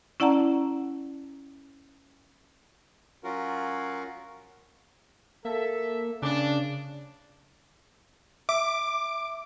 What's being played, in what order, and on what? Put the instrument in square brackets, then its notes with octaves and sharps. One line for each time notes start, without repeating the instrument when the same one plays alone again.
[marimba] C#4 E4 D5 F#5 A5 A#5
[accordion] F#3 C#4 F4 F#4 A#4
[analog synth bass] A#3 [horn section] A4 E5
[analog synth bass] C#3 [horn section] D4
[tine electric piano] E5 [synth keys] D6